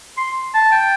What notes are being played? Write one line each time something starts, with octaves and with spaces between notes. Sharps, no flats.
C6
A5
G5